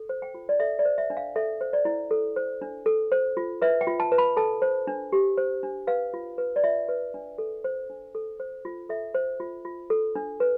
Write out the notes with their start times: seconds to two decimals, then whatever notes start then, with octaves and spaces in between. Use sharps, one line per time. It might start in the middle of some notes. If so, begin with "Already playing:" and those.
Already playing: A4
0.09 C5
0.22 G5
0.34 F4
0.49 D5
0.60 A4 E5
0.79 D5
0.85 C5
0.98 E5
1.10 D4
1.17 F5
1.36 A4 E5
1.61 C5
1.73 D5
1.85 E4
2.11 A4
2.36 C5
2.62 D4
2.86 A4
3.12 C5
3.37 F4
3.62 B4 E5
3.81 G5
3.87 F4
4.00 A5
4.12 B4
4.18 B5
4.37 A4 A5
4.62 C5
4.87 D4
5.12 G4
5.37 C5
5.63 D4
5.87 B4 F5
6.14 F4
6.38 B4
6.56 D5
6.63 F4 E5
6.89 B4
7.14 D4
7.38 A4
7.64 C5
7.90 D4
8.15 A4
8.40 C5
8.65 F4
8.89 A4 E5
9.14 C5
9.40 F4
9.65 F4
9.90 A4
10.15 D4
10.40 B4